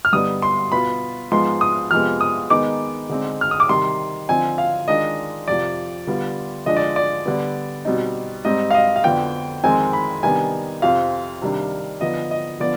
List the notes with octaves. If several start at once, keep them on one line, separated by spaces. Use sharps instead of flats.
F6
G2 D3 G3 B3 D#4 D#6
C6
B2 B3 F4 B5
G#2 F3 G#3 B3 C6
D#6
F2 C3 F3 G#3 B3 F6
D#6
D#3 G#3 B3 D#4 D6
D3 G#3 C4 D#4
F6
D#6
D6
C3 D#3 G3 C6
D3 F3 C4 D#4 G#5
F5
D#3 G#3 D4 F4 D#5
F2 C3 F3 D5
D3 G3 B3 F4
D3 F3 G#3 D4 F4 D#5
D5
D5
D3 G3 B3
B2 G3 C4 D#4
G#2 G3 C4 D#4 D#5
F5
D#5
F5
F2 D3 F3 B3 G5
F2 D#3 G#3 C4 G#5
B5
C3 D#3 G3 B3 D4 G#5
F2 C3 F3 C4 F5
C3 D#3 G3 D4
D3 F3 B3 D#4 D#5
D#5
D3 F3 B3 D5